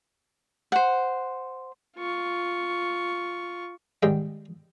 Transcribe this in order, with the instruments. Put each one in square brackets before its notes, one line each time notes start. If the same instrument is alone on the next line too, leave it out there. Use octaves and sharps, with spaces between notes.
[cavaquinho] C5 F#5
[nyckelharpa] F4 C#6
[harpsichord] G#2 D#3 G3 G#3 G5